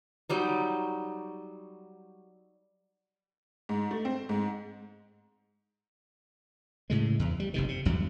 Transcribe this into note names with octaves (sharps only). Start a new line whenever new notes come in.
F#3 G3 D#4
G#2
A3
C4
G#2
A2 C#3 G#3
E2
G3
F#1 C3 D#3
C3
G#1 E2 G2 F#3